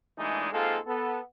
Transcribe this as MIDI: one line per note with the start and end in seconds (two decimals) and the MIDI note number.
0.18 0.50 46
0.18 0.50 52
0.18 0.50 56
0.18 0.50 57
0.18 0.50 62
0.18 0.50 63
0.52 0.78 44
0.52 0.78 56
0.52 0.78 58
0.52 0.78 60
0.52 0.78 65
0.52 0.78 69
0.86 1.19 59
0.86 1.19 69